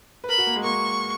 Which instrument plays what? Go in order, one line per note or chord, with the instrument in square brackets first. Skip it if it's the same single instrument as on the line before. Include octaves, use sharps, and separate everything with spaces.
[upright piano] B4
[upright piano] A#4 [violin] B5
[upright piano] F#4
A#3
G#3
[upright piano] A#3 [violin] C#6